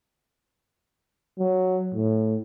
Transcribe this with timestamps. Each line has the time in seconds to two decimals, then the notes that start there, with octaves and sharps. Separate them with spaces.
1.39 F#3
1.94 A2